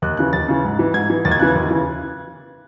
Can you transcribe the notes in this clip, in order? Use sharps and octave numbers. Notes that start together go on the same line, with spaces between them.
D#2 F#6
C#3 E3 F#6
D#2 A6
C#3 E3
G#2
E3
G#2 G#6
E3
D#2 A6
G#6
C#3 E3 F#6
G#6
D#2
C#3 E3